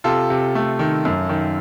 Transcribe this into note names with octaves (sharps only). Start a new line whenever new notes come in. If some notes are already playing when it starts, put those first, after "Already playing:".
C3 F4 A4
C3
A3
D#3
F#2
D#3